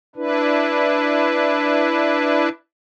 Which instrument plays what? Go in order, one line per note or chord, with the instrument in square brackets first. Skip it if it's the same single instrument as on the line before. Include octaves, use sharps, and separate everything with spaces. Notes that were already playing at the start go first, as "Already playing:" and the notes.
[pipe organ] D4 E4 B4